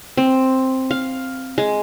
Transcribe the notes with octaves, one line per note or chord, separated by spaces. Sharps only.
C4
F5
G#3